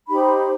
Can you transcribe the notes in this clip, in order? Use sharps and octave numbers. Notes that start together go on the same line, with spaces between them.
D#4 G4 C5 B5